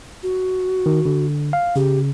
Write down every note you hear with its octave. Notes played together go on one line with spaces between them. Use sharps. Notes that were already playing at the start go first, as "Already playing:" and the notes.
F#4
D#3
D3
F5
C#3 G4